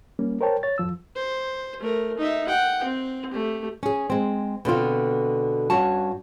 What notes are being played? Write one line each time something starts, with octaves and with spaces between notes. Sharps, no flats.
G3 A#3 C#4
A#4 C5 C#5 G5 A5
C#5 A6
F2 F3 E6
C5
A3 A#4
D#4 E5
F#5 G5
C4
A3 G4
C#4 G#4
G#3 C4
B2 D3 C4 F4
G2 C#4 F#4 C#5 A5